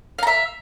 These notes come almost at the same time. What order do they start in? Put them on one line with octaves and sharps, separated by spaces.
F5 A#5 E5